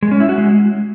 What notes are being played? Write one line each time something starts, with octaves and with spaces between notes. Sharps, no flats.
G#3
C#4
E4
F#4
G#3